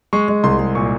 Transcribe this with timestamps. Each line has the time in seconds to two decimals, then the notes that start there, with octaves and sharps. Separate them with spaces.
0.13 G#3 C#6
0.28 G#3
0.43 C2 C6
0.59 G#3
0.75 A#2 C#6